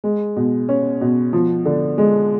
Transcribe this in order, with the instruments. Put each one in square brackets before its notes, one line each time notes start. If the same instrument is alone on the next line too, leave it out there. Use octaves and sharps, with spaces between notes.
[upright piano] G#3
B2
C#4
B2
F3
D3
G#3